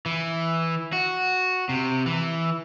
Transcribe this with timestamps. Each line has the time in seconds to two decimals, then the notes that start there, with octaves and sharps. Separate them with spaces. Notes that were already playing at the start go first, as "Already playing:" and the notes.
0.06 E3
0.93 F#4
1.69 C3
2.06 E3